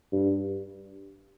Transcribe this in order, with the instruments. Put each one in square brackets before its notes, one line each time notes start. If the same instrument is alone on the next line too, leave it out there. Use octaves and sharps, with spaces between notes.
[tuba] G2